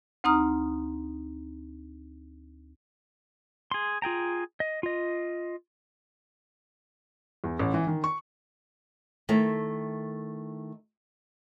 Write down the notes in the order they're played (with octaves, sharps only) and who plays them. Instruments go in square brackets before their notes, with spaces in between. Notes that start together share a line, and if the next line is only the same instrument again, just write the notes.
[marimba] D2 C4 D#4 A#5 D#6 F6
[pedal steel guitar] G#4 C6
F4 G#4 G5 A#5
D#5
F4 D#5
[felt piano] E2
A1
E3
D#3
C#6
[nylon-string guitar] D#3 A3 E4 E5